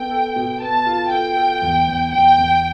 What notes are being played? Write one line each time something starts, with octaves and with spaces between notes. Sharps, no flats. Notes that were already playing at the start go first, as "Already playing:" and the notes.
Already playing: B3 A4 G5
A4
B2
B3 A5
F4
A4 G5
A4
E2
E2
E2 G5
E2